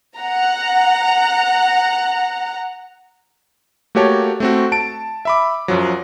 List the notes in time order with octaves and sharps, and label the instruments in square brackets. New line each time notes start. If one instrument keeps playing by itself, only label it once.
[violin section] F#5 A#5
[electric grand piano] A3 A#3 F#4 G4 C#5 A5
A3 C4 F#4
A5 D7
E5 B5 D6
F#2 F3 F#3